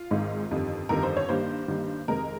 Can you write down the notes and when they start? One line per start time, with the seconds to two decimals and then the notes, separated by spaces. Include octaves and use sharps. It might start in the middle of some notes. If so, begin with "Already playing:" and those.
Already playing: F4
0.11 G#1 G#2 D#3 G#3
0.51 G1 F2 D#3 G3
0.89 G1 F2 D#3 G3 A#4
1.03 C5
1.17 C#5
1.29 G2 D#3 G3 A#3 C5
1.68 G2 D#3 G3 A#3
2.08 F2 C3 D#3 G#3 A#4